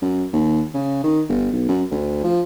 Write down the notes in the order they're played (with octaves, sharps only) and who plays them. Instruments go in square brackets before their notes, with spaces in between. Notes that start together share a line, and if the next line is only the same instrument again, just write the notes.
[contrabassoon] F#2
D#2
C#3
D#3
G1
B1
F#2
D2
F3